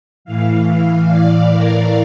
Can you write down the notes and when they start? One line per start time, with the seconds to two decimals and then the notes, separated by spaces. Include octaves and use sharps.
0.25 A2 E3 F5
1.08 D5
1.51 A#4